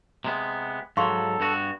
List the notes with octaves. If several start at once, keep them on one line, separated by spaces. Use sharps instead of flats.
C3 G#3 B3
G#2 F#3 A4 F5 C6 C#6
G2 B3 F#4